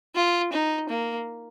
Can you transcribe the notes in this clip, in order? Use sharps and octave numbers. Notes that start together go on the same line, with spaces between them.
F4
D#4
A#3